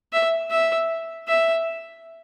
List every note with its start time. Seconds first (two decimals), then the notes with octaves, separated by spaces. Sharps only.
0.13 E5
0.51 E5
1.28 E5